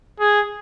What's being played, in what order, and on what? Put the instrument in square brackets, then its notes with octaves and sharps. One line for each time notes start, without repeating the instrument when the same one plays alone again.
[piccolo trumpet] G#4